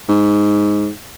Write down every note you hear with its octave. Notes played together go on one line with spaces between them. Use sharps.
G#2